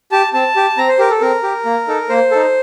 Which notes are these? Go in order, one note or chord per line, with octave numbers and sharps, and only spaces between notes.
G4 A5
C4 A5
G4
C4 A#5
C5
G4 A#4
A4
C4 A#4
G4
A#3
D#4 A4
A#3 C5
D#4 A4